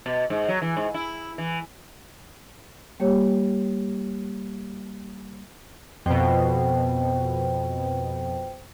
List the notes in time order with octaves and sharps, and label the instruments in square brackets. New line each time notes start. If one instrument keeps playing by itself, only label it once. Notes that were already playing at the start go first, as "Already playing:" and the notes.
[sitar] B2
G#2
F#3
E3
G#2
E4
E3
[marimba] G3 A#3 G4 C#5
[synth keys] F2 B2 [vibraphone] C5 G5